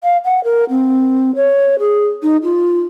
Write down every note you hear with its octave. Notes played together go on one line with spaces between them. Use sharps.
F5
F#5
A#4
C4
C#5
G#4
D#4
F4